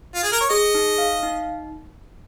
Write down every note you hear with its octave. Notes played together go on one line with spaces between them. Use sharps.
F4
G#4
A#4
C#5
G#4 D#5
D#4
F5
D#4